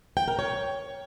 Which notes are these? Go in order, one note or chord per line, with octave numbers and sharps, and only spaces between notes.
G5
A#4
C#5